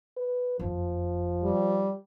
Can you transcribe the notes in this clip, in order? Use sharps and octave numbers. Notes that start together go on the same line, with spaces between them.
B4
F#1 F2 F3
G3